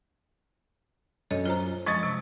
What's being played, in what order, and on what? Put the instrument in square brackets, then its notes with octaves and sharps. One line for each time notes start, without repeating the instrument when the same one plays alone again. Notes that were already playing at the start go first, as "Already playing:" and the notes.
[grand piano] F#2 [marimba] A4 C#5 D#5
[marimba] F4 C5 A#5
[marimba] F3 G#3 D#5 [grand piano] C#6 D#6 A6
[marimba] C3